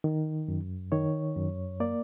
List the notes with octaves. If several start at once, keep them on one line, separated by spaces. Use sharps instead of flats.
D#3
F#2
D#3 C#5
F#2
A#3 D5